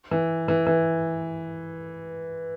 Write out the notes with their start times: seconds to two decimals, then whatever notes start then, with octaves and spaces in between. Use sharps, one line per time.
0.11 E3
0.48 E3
0.67 E3